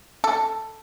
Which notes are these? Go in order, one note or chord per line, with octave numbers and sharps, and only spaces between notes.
A4